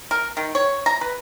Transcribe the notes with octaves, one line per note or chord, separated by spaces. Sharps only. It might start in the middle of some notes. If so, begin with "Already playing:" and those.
A#4
D#3
C#5
A#5
B4